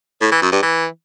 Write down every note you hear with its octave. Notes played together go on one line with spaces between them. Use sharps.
A2
E3
F#2
G2
E3